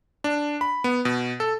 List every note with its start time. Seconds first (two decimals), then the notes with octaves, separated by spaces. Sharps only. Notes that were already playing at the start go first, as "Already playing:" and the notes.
0.24 D4
0.61 B5
0.84 B3
1.05 B2
1.40 A4